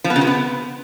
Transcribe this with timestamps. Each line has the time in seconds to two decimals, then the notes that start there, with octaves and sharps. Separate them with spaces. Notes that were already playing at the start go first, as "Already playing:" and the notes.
0.04 F3
0.10 B3
0.16 C#3
0.21 C3
0.27 B3